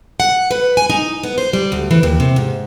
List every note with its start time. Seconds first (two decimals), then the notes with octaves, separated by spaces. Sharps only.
0.20 F#5
0.51 B4
0.77 G#5
0.90 D#4
1.23 B3
1.38 C5
1.53 G3
1.72 D2
1.91 E3
2.03 D#2
2.20 C3
2.36 G#2